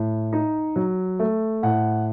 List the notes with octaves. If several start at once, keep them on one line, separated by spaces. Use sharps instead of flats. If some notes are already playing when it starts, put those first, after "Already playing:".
Already playing: A2
D#4
F#3
A3
A2 F#5